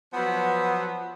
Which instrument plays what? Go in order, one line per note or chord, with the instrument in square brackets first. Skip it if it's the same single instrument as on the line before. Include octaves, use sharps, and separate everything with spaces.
[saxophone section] F3 F#3 B3